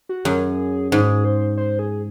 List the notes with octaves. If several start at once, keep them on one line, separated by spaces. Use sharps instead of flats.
F#4
F#2 G#4
G#2 G#4
C5
C5
G#4